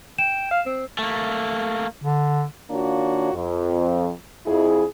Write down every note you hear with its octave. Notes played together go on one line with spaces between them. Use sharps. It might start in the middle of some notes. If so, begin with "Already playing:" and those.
G5 E7
F5
C4
A3 A#3
D3
D#3 A#3 D4 F4 F#4 C#5
F2
F2 E4 G#4